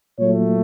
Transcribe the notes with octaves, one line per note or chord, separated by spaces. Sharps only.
A#2 F#3 A3 C#5